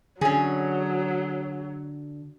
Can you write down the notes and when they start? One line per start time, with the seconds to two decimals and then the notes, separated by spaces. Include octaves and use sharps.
0.21 D3 F#3 C#4 G#4